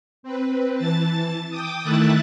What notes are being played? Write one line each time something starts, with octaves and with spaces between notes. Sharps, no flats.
C4 B4
E3 A5 A6
G5 D6 D#6
D#3 A3 E4 E5 F#6 A6